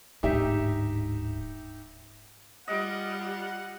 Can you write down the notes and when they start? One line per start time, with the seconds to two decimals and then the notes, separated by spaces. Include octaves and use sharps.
0.23 D1 G#2 D#4 G4 E5
2.68 G3 F4 D#5 F#5